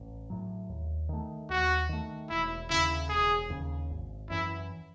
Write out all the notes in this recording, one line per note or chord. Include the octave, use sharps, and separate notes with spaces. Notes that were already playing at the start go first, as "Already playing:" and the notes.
Already playing: A1
A2 F#3
D#2
D#3 A3
D#2 F#4
D#3 A3
E1 E4
D#2 C#3 E4
E1 G#4
D#2 C#3
G#1
F#2 E3 E4